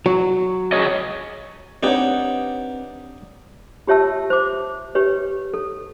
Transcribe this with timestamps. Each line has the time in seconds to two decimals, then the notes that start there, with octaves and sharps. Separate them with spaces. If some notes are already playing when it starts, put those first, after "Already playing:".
0.06 F#3 F#4
0.72 G#4 C#5 D#5
1.83 C4 D4 D#4 G4 B4 C#5 F#5
3.87 F4 G4 C#5 E5 A5 E6
4.30 C5 D6
4.95 G4 B4 C#5
5.54 A4